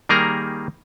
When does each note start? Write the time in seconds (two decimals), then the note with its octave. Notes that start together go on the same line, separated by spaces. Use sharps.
0.09 D#3 G3 A#3 G#4 A#4 A#5